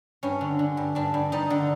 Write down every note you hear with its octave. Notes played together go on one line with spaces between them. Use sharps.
G2 C#4
D3
D3
G2
G2 D4
G2
G3 D#4
D3